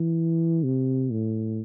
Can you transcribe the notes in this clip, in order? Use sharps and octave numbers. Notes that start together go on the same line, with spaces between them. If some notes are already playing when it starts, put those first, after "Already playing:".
Already playing: E3
C3
A2